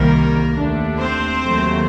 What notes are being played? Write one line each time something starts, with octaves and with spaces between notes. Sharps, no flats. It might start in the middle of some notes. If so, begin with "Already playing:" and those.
Already playing: C2 C3 D#3 G3 A#3 A#4
D#2 D3 A3 D4
C4 C5
D#2 D#3 F#3 A3